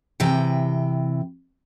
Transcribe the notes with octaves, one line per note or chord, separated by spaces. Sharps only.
C3 E3 G5